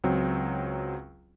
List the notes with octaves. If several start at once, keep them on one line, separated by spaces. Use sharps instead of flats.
C#2 F#3 C4